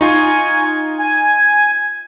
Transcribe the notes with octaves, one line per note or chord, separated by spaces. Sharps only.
D#4 F4 G#5 C#6
G#5